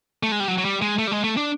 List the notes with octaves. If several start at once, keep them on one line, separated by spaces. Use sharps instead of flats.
A3
G#3
G3
F#3
F#3
G3
G#3
A3
G3
G#3
A3
D4